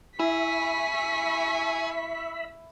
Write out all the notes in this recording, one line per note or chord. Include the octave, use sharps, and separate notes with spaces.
E4 G#4 E5 B5 C#6 B6